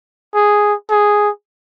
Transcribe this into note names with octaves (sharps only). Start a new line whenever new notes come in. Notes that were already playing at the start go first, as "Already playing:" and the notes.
G#4
G#4